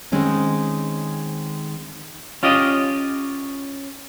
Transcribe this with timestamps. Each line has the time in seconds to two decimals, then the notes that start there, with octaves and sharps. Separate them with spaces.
0.12 D#3 G#3 C4 C#4
2.43 C#4 F4 G4 D#5